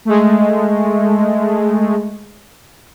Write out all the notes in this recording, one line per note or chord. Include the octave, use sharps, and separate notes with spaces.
G#3 A3